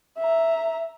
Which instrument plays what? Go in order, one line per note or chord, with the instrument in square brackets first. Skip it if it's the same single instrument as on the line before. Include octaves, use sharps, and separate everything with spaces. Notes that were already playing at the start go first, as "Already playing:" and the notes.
[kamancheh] E5 A#5